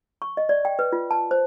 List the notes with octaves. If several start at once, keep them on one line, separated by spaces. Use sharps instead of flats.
C#6
D#5
D5
G5
B4
F4
A5
C5